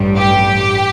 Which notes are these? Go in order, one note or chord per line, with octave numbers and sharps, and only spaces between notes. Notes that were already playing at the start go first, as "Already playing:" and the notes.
Already playing: A1 G2 G3
G4